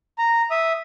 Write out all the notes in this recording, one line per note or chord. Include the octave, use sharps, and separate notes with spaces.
A#5
E5 D#6